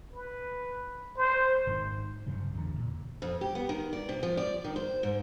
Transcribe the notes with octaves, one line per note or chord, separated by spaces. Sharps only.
B4
C5
G#1 G#2 B2 D#3
C2 G2 C#3 F#3
A1 E2 D3
E1 A#2
F2
G4
B3
D#3
D5
C3
F3
D5
D#3
C5
G#2